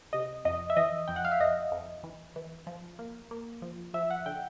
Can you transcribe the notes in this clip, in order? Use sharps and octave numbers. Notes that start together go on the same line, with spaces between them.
C3 D#5
F2 D#5
E5
E3 D#5
F2 G5
F#5
F5
E5
F2 D#5
F2
E3
E3
F3
A#3
A#3
F3
F3 E5
F#5
D3 G5